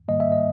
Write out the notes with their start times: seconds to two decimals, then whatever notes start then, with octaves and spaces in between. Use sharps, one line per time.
0.08 G#2 D#3 G3 A#3 D#5
0.20 E5
0.32 D#5